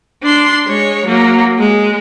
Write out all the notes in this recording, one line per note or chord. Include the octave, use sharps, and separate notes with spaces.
D4 C6
G#3 C#5
F#3 A#3
G#3